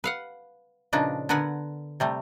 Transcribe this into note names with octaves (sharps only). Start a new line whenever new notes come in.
B4 F5 F#5
A#2 C#3 F3 D4 D#4 B4
D3 B3 A#4 B4 F#5 G#5
C3 G3 A3